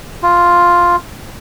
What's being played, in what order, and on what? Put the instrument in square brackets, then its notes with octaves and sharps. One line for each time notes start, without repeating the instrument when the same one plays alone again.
[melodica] F4